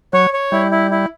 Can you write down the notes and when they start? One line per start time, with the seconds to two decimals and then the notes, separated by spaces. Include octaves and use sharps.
0.13 F#3 C#5
0.33 C#5
0.52 G3 E4
0.71 E4
0.91 E4